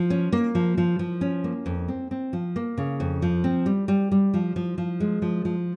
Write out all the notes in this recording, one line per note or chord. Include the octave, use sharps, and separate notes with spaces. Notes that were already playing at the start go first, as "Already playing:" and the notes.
Already playing: F3
C#4
A#3
F3
F3
F3
C#4
A#3
F2
C4
C4
F3
A#3
C#3
F2
F3
C4
G3
G3
G3
F3
F3
F3
G#3
F3
F3